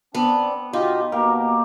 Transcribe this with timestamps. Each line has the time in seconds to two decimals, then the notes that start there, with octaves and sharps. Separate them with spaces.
0.15 B3 C4 D4
0.73 B2 D#4 F4 G4
1.12 B2 A#3 G4 A#4